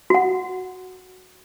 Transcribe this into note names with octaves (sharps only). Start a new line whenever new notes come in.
F#4 F#5